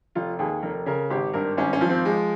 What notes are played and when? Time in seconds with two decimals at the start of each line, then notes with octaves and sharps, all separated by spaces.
0.15 F1 F4
0.39 D#2 G#4
0.62 F1 A#4
0.86 C#3 A#4
1.10 G#1 G4
1.33 G2 A#4
1.57 G#1 C#4
1.73 C#4
1.81 F3
1.89 C4
2.05 G#3